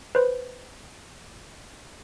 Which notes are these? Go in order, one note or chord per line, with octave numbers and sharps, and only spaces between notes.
B4 C5